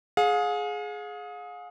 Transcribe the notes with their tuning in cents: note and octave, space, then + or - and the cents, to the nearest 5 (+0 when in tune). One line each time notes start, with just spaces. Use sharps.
G#4 +15 F5 +40